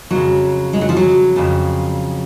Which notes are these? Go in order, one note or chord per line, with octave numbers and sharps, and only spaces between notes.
F2 C#3 F#3
G#3
F#3
F3
F#3
F2 C#3